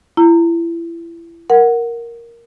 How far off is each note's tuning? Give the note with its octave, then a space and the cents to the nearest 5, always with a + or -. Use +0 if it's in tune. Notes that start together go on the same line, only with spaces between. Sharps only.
E4 +30 A#5 -25
A#4 +0 F#5 +0